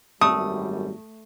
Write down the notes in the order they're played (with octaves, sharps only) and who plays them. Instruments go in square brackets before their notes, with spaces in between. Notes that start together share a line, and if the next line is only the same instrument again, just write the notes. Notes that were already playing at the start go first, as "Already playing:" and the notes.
[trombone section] G#1 F#2 G3 [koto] A3 [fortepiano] D#6